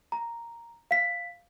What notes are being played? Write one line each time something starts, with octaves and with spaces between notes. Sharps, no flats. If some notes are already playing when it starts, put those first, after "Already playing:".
A#5
F5 B6